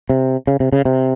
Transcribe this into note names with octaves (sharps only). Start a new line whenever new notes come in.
C3
C#3
C3
C#3
C3